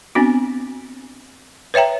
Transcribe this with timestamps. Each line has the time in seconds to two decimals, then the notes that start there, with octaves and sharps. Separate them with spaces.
0.15 B3 C4 D4 F#4
1.74 B4 C#5 E5 G5 A#5